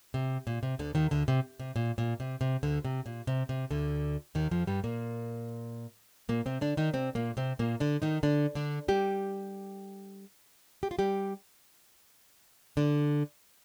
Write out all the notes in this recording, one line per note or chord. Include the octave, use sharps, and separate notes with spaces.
C3
A#2
C3
D2 D3
D#2 D#3
D2 D3
C3
C3
A#2
A#2
C3
C3
D2 D3
C3
A#2
C3
C3
D2 D3
D#2 D#3
F2 F3
G2 G3
A#2 A#3
A#2 A#3
C3 C4
D3 D4
D#3 D#4
C3 C4
A#2 A#3
C3 C4
A#2 A#3
D3 D4
D#3 D#4
D3 D4
D3 D4
G3 G4
G4
F4
G3 G4
D3 D4